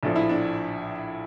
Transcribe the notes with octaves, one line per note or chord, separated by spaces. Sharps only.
A#1 A2 F3 D4
E4
D4